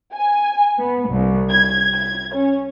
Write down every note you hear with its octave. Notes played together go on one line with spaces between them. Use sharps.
G#5
B3
C2
G#6
G#6
C#4